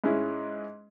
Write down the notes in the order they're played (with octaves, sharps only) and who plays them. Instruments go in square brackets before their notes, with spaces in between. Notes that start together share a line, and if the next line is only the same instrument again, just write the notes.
[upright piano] G#2 G#3 C#4 E4